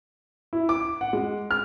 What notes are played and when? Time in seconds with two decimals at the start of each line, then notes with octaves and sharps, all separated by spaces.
0.53 E4
0.69 D6
1.01 F#5
1.13 G#3
1.51 F6